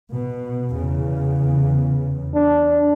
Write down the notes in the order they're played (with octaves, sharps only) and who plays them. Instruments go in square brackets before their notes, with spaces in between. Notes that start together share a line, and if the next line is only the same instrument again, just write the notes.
[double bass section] B2
E2 C#3
[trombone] D4